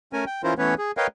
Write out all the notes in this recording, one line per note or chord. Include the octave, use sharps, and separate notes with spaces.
A3 C#4 A#4 G#5
G5
E3 C#4 E4 F4 A#4 C5
E3 A3 B3 C#4 B4 C#5
G#4
A#4 B4 C#5 D#5 F5 G5